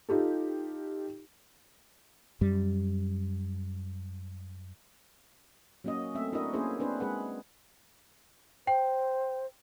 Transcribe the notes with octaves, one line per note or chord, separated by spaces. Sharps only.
D#4 F4 G4 A4
F#2 G3
F#3 A#3 C#4 F#4 D#5
A3 C4 E5
D4 E4 F#4 A#4 D#5
A#3 C#4 E4 G#4 C5
C4 D4 B4 C5
G#3 G#4 B4 F#5
C5 G5